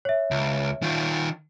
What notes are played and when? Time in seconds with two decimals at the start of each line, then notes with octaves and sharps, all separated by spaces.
0.05 C#5 E5
0.31 C#2
0.82 D#3 F4